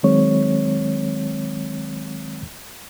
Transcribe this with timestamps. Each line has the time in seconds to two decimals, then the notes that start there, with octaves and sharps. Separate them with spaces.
0.03 D#3 F#3 G#3 C4 C#5